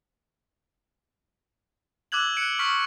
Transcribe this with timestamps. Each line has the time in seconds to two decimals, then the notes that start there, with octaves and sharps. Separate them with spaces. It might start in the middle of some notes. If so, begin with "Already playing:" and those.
2.12 D6 E6 F#6 G#6 F#7
2.37 F#6 C#7 D7
2.59 C#6 F6 B6